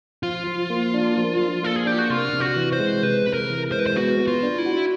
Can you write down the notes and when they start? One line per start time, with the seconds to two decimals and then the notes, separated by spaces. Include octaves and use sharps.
0.23 F3 F4
0.47 F3
0.70 A#3
0.94 D4
1.17 F3
1.40 F3
1.63 A#3 A4
1.76 G#4
1.86 D4 G4
1.98 F#4
2.10 C3 F4
2.33 C3
2.40 F#4
2.56 E3
2.72 C5
2.79 G#3
3.03 C3 B4
3.27 C3
3.33 A#4
3.50 E3
3.72 G#3 C5
3.79 B4
3.87 C5
3.96 B3 F#4
4.20 B3
4.27 F4
4.43 D4
4.58 E4
4.66 F#4